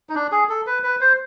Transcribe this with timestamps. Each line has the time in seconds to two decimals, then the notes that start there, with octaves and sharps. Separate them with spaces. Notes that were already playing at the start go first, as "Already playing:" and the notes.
0.10 D#4
0.15 D4
0.32 G#4
0.49 A4
0.67 B4
0.84 B4
1.01 C5